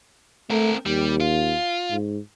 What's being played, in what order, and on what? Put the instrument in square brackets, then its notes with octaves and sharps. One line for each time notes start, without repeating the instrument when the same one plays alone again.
[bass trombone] A3 [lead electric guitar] C4 A#4
[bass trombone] D#2 [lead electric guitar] G3
[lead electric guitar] F4
[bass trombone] G#2